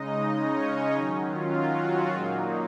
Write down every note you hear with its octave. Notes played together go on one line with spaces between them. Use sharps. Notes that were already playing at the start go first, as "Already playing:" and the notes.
Already playing: C#3 G#3 D#4 D#5
C#4 C#5
D#3 F#3 C#4 D#4
F4
F#3 F#4
A#2 F#3 G#3 A#3 D#4 G#4